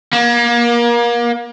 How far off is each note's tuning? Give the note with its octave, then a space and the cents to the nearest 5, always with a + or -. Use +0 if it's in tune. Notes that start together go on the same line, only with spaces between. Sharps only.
A#3 +30